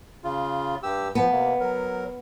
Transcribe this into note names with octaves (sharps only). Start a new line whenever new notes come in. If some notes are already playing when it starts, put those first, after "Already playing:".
C#3 F4
G2 G4 E6
F3 B3
C3 A#3
F#3 A#4